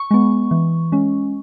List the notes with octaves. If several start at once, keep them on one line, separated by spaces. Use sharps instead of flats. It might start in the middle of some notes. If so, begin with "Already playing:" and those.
Already playing: C#6
G#3 B3
E3
G#3 C#4